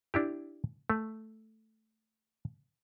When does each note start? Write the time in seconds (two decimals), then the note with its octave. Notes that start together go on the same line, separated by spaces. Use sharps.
0.14 D4 E4 G4
0.90 A3